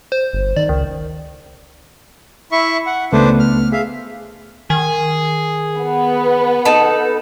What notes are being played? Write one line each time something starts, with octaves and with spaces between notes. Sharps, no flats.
C5
G1
D#3 D5
C#2 D#3
E4 E5 C#6
F#5
C#2 A3 B3 D4 B4 C5
F6
G#4 E5 F5
D#3 G#4
B3
D#4 A4 B4